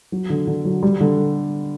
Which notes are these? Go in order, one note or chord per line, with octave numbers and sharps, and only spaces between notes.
F#3
D3
D3
F#3
G3
D3